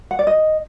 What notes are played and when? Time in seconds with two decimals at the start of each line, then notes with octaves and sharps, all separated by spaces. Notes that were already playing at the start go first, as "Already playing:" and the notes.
0.11 F#5
0.19 D5
0.27 D#5